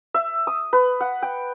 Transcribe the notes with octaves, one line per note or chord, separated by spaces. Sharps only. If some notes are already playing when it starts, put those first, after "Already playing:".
E5
D#6
B4
F#5
G5